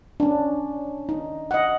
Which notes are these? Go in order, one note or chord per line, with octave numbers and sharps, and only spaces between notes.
C#4 D4
D#4
D#5 F#5